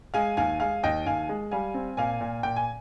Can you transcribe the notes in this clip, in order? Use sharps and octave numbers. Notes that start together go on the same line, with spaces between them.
G#3 F5 G#5
D#2 F5 G#5
G#3 F5 G#5
D#2 D#5 G5
D#2 F5 G#5
G#3
G3 F5 G#5
C4
A#2 F5 G#5
A#2
A#2 G5
G#5